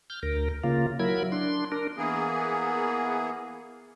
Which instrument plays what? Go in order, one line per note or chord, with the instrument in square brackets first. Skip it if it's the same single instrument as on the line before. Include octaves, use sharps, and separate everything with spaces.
[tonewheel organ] F6 G6
D2 A#4
C#3 A#3 F4
F#3 E4 A#4 B5 G#6
D4 C6
D4 A#4
[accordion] E3 A#3 B3 G#4